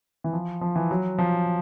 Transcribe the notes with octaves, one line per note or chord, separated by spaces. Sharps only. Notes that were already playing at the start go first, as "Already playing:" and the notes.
E3
F3
F3
E3
F#3
F3